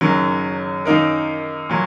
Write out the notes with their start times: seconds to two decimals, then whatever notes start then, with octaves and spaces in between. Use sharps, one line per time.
0.01 F#1 F#2 D#3 F#3
0.85 F#2 D#3 A#3 D#4 A#4
1.69 A#2 F#3